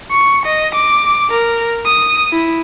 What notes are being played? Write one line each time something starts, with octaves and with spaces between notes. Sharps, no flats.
C#6
D#5
D6
A#4
D#6
E4